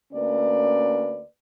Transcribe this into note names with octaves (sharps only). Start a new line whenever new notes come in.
D2 A#3 C#4 B4 D5